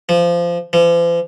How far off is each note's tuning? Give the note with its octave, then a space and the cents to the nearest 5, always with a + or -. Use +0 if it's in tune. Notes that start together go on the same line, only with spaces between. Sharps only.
F3 -20
F3 -45